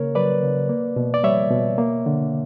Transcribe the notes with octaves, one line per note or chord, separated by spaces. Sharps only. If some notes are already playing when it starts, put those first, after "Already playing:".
Already playing: C#3 A#3 A#4 C#5
F#3 B4 D5
C#3
A#3
B2
D5
G3 C#5 E5
B2
A#3
D3